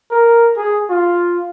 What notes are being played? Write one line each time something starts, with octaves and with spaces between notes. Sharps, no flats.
A#4
G#4
F4